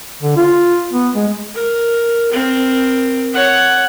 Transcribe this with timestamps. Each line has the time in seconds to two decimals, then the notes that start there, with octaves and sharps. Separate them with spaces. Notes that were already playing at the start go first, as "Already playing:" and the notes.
0.22 D3
0.37 F4
0.93 B3
1.15 G#3
1.54 A#4
2.32 C4 A#4
3.34 C#5 F#5